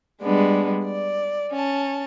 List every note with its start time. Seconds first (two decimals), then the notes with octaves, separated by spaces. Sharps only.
0.22 G3 G#3 B3 D4
0.84 D5
1.52 C#4 A5